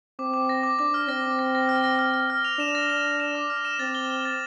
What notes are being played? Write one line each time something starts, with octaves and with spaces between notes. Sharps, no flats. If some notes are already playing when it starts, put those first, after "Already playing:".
C4 D6
D6
A#6
D6
D4 D6
F6
C4 A#6
D6
A#6
A#6
F6
A#6
F6
F6
F6
F7
D4 E7
A#6
E7
A#6
E7
D6
F6
E7
C4 A6
G7
G7
A6